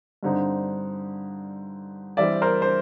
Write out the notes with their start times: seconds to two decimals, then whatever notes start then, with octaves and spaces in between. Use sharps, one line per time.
0.23 G2 D3 G3 C4 D#4
2.17 E3 G3 C4 D5 E5
2.42 A#4 C5
2.62 C5